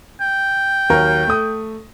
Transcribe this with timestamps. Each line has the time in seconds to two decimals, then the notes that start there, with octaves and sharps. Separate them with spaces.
0.21 G5
0.90 D#2 F#3 A#4
1.27 A3 D#6